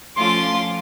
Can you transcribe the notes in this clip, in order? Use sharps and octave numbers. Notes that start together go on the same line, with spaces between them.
F3 A3 C#4 F4 C6 D6